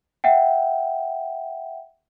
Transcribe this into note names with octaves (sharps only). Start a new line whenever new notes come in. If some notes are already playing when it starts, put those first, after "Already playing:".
E5 F#5 G5